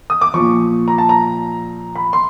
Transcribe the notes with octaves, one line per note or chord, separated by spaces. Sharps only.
D#6
D6
A#2 F3 C#6
A#5
A5
A#5
B5
C6